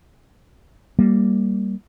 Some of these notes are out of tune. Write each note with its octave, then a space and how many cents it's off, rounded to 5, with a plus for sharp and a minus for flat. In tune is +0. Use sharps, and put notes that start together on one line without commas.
G3 +0 A#3 +0